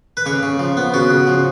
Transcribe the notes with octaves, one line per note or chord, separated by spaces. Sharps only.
B4
C#3 C#5
C#3
F3
B3
C#3 F#4
C#3
F3